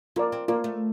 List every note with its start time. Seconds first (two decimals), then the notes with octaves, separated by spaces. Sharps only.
0.16 A#3 F4 A#4 D5
0.32 C4
0.48 A#3 F4 A#4 D5
0.64 A3